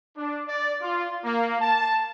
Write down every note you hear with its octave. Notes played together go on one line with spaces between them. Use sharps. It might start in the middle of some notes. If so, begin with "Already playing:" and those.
D4
D5
F4
A#3
A5